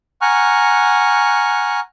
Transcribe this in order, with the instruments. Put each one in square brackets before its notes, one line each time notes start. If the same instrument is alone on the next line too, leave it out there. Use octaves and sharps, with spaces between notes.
[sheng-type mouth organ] F#5 G#5 A#5 C#6 F6 F#6